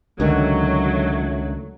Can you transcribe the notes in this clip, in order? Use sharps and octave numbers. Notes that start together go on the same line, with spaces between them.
C#2 D3 D#3 F#3 A3